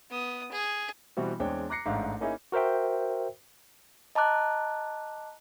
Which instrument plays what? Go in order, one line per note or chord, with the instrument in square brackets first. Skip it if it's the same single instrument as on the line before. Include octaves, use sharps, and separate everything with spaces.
[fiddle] B3 D#6
G#4
[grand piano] B2 E3 G3 C4 F#4
E2 G#3 C4 D4 C#5 G5
A#5 D6 F#6 A#6 C7 C#7
A1 G#2 A3 D4 F5 F#5
A#3 C#4 D#4 E4 G#4
[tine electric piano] F#4 A#4 C5 E5 G5
[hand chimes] D#5 A5 A#5 D6 F#6